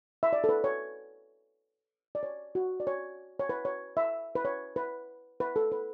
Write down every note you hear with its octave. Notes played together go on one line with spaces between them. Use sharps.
E5
D5
A4
B4
C#5
D5
C#5
F#4
D5
C#5
C#5
B4
C#5
E5
B4
C#5
B4
B4
A4
B4